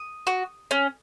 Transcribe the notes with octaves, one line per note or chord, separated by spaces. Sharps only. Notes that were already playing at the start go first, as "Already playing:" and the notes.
Already playing: D#6
F#4
C#4